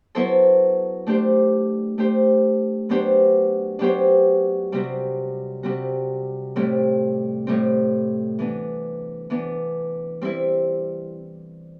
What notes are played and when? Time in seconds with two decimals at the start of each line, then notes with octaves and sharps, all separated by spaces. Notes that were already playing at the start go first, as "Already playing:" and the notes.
0.15 F#3 B3 E4 A4 C5
1.07 A3 D4 G4 C5
1.98 A3 D4 G4 C5
2.89 F#3 B3 D4 G4 C5
3.79 F#3 B3 D4 G4 C5
4.72 C3 G3 C4 F#4
5.63 C3 G3 C4 F#4
6.56 A2 G3 C4
7.47 A2 G3 C4
8.39 E3 B3 D4
9.30 E3 B3 D4
10.22 G3 C4 E4